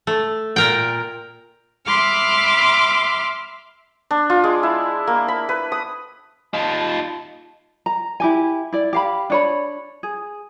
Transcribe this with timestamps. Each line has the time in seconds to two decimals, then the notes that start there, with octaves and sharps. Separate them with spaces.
0.07 A3
0.56 A#2 A#4 G5
1.86 E5 B5 C6 D6 F6
4.11 D4
4.30 F4
4.44 G#3
4.63 E4
5.07 A#3
5.28 B5
5.49 B4
5.72 D#6
6.54 D#4 F4 A5
7.86 A#5
8.20 E4 G4 G#5
8.73 E4 D5
8.93 G4 F5 B5
9.30 D4 C#5 B5
10.03 G#4